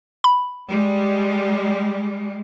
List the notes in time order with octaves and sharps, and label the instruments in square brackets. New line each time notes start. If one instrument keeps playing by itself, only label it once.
[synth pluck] B5
[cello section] G3 G#3